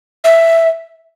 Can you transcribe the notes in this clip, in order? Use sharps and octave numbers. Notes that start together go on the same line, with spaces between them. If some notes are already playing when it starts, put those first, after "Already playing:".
E5